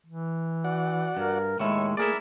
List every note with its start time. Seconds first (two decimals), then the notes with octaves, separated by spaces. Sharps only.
0.06 E3
0.64 F#4 D5 F#5
1.17 G2 A#4
1.59 D#2 A2 G#3 E4 C#6
1.97 A3 A#3 E4 G#4 A#4 D5